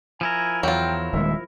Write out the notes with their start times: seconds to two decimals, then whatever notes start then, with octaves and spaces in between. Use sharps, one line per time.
0.21 F3 E4 A#4 G#5
0.63 E2 F#3 F4 G5
1.13 D#1 D#3 G#3 E5